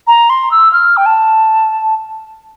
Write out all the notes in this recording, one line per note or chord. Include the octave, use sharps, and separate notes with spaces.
A#5
C6
E6
F6
G5
A5